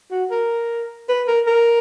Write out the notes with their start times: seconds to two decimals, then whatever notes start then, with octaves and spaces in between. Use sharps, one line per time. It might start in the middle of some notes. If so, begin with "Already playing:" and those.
0.11 F#4
0.31 A#4
1.09 B4
1.28 A#4
1.47 A#4